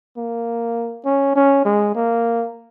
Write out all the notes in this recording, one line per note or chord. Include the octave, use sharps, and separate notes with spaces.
A#3
C#4
C#4
G#3
A#3